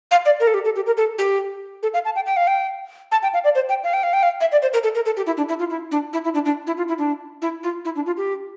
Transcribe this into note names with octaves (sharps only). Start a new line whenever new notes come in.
F5
D5
A#4
A4
G4
A4
G4
A#4
A4
G4
A4
F5
A5
G5
G5
F5
G5
A5
G5
F5
D5
C5
G5
F5
G5
F5
G5
F5
E5
D5
C5
A#4
A4
A#4
A4
G4
E4
D4
E4
F4
E4
D4
E4
E4
D4
D4
E4
F4
E4
D4
E4
F4
E4
D4
F4
G4